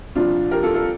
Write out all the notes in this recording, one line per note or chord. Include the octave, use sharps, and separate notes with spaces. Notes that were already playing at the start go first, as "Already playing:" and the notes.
C2 A#2 F3 D4 F4
G4 A#4
F4 A4
F4 A4